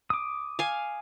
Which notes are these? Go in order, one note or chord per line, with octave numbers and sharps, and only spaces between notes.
D6 D#6
F5 G#5